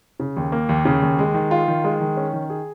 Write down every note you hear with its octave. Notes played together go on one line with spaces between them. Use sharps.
C#3
D#2
A#3
D#2
C#3
D#2
G#3
D#3
F4
D#3
G#3
D#3
C#4
D#3
G#4